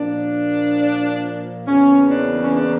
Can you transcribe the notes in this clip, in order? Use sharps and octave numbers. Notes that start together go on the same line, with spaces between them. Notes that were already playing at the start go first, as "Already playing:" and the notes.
Already playing: A#2 F3 A#3 D4
E2 C#3 E3 A#3 C#4
D4
C#4
D4